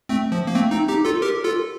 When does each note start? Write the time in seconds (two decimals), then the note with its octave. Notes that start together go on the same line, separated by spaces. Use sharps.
0.09 A3 C4
0.32 F3
0.47 A#3
0.55 A3 C4
0.71 C4 D#4
0.88 D#4 G4
1.05 F4 A4
1.22 G4 A#4
1.44 F4 A4